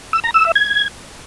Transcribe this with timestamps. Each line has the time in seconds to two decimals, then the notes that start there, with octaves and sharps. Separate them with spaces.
0.13 E6
0.24 A#5
0.34 E6
0.45 E5
0.55 G#6